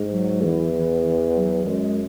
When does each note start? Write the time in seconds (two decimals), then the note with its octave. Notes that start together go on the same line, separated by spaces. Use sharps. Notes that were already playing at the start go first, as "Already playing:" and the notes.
Already playing: G#2
0.12 F#3
0.43 E2 E3
0.74 E3
1.36 F#3
1.66 F#2 G#3